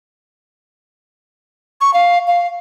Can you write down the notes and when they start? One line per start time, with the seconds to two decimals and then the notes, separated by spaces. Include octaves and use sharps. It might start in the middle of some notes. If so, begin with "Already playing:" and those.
1.81 C#6
1.94 F5
2.28 F5